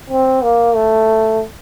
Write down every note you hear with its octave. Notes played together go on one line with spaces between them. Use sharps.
C4
A#3
A3